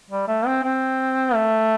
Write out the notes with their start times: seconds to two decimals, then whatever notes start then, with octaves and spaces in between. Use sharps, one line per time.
0.10 G3
0.28 A3
0.46 C4
0.63 C4
1.34 A3